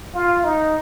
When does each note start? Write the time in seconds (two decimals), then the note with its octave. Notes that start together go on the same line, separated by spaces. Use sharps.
0.15 F4
0.44 D#4